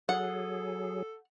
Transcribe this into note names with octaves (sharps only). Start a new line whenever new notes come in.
F#3 G#4 A4 F#5